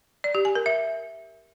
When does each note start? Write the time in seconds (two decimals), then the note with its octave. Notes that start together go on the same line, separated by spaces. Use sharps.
0.24 D5
0.35 G4
0.45 G#5
0.55 A#4
0.66 E5